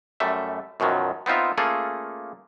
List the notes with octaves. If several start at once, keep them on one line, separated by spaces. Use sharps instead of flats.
F#2 G3 A3 E5
F#2 B2 D#3 F3 F#3
B3 C4 D#4 F4 E5
A3 A#3 C#4 F4 G#4 A4